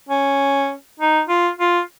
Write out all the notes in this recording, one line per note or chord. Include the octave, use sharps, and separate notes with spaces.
C#4
D#4
F4
F4